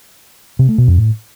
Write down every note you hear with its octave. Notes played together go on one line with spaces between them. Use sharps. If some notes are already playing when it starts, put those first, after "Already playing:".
C3
A3
B2
F2
A2